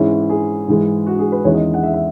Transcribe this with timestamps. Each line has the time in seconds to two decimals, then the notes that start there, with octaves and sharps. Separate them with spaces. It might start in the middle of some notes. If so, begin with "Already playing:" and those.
Already playing: G#2 E3 G#3 C#4 E4
0.29 G#4
0.67 G#2 E3 G#3
1.06 F#4
1.19 G#4
1.32 B4
1.45 E2 D#3 G#3 C#4 E4 C#5
1.54 D#5
1.74 F#5
1.83 E5
1.94 E5